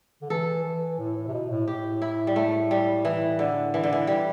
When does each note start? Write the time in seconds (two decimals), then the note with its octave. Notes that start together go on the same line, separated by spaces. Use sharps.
0.22 D3
0.30 E3 A4
0.64 E3
0.98 A2
1.16 A2
1.28 C3
1.33 B2
1.50 A2
1.67 A2 G4
2.02 E4
2.27 G3
2.36 A3
2.71 G3
3.05 E3
3.39 D3
3.74 E3
3.83 D3
3.93 E3
4.07 G3